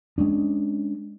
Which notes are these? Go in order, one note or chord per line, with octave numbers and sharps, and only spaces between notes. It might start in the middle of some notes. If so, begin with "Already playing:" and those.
G#3 C#4 D4